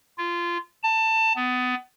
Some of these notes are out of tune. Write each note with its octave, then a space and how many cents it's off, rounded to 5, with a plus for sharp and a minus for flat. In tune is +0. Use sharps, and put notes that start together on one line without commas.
F4 -20
A5 +20
B3 +25